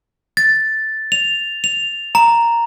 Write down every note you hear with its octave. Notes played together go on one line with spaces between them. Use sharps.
A6
F7
F7
A#5